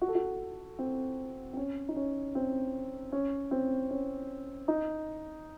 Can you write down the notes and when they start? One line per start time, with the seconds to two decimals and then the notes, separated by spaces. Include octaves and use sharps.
0.01 F#4
0.08 A4
0.15 F#4
0.79 C4
1.53 C4
1.57 C#4
1.88 D#4
1.96 C#4
2.35 C4
3.12 C#4
3.51 C4
3.90 C#4
4.68 D#4